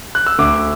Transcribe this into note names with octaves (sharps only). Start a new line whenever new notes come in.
F#6
E6
D2 D6